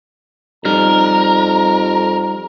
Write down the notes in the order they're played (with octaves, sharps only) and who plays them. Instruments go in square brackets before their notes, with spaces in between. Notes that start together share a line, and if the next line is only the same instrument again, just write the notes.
[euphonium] F2 [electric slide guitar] G3 D#4 [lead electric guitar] A#4 [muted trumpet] A#5